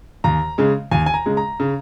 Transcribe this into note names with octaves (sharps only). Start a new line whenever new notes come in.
D#2 A#5
C#3 G#3
D#2 G#5
G#5
A#5
C#3 G#3
A#5
C#3